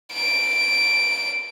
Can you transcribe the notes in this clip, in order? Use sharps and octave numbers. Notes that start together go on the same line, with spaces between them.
D7